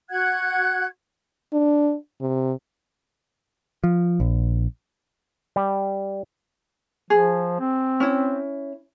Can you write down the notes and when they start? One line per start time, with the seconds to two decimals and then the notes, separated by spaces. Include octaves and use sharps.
0.10 F#4 F#5 F#6 G#6
1.53 D4
2.21 C3
3.84 F3
4.20 A#1
5.56 G3
7.10 F3 G#4
7.60 C4
8.00 C#4 E4